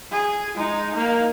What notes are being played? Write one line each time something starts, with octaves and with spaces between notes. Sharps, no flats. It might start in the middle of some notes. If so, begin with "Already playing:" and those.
G#4
G#3 D#4
A#3 D#4